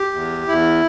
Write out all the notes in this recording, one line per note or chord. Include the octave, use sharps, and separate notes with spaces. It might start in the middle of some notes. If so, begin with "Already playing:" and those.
Already playing: G4
E2
E2 E4